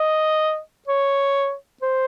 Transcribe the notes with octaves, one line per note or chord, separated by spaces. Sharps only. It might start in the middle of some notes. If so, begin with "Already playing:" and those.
Already playing: D#5
C#5
C5